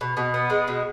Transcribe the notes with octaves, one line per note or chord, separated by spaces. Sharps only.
B2
B2
B3
G#3
B2